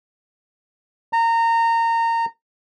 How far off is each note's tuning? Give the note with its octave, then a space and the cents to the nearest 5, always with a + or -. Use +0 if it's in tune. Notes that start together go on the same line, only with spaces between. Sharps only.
A#5 -25